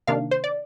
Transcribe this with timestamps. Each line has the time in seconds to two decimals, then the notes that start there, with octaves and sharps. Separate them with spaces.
0.07 C3 D#3 A#3 D4 F5
0.31 C5
0.44 D5